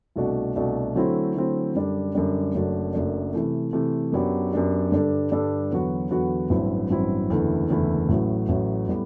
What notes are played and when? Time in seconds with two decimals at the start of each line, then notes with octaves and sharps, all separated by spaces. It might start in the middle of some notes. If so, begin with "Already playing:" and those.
0.16 C2 B2 A3 D4 F#4
0.56 C2 B2 A3 D4 F#4
0.95 D3 F#3 A3 C4 E4
1.35 D3 F#3 A3 C4 E4
1.75 F#2 D3 G3 D4
2.15 F#2 D3 G3 D4
2.54 F#1 F#2 F#3 A3 D4
2.94 F#1 F#2 F#3 A3 D4
3.33 C3 E3 A3
3.73 C3 E3 A3
4.12 F#2 F#3 B3 D4 G4
4.52 F#2 F#3 B3 D4 G4
4.92 G2 D3 G3 D4 A4
5.31 G2 D3 G3 D4 A4
5.71 E2 D3 F#3 B3 F#4
6.11 E2 D3 F#3 B3 F#4
6.50 A1 G2 F#3 C4 E4
6.90 A1 G2 F#3 C4 E4
7.30 F#1 E2 D3 A3 E4
7.69 F#1 E2 D3 A3 E4
8.09 A1 A2 F#3
8.49 A1 A2 F#3
8.88 A2 G3 B3